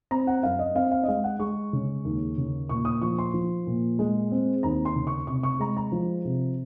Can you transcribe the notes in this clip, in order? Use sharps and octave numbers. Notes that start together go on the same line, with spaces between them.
C4 A#5
F#5
F#2 F5
D#5
C4 F5
F5
D#5
G#3 F5
F#5
G#3 C#6
C#3
D#2
C#3
A#2 C#6
D#6
F3 C#6
C6
F3
A#2
G#3
C4
D#2 A#5
C6
C#3
C#6
C3 C#6
C#6
G#3 A#5
A#5
F3
C3